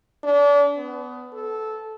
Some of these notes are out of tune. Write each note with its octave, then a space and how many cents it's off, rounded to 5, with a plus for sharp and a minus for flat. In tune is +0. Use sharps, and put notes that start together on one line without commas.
D4 -35
B3 +20
A4 -15